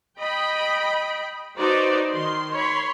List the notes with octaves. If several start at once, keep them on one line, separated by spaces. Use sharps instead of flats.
D#5 G5 B5
D#4 F#4 B4 C5 D5
D#3 C6
C#5 B5 C6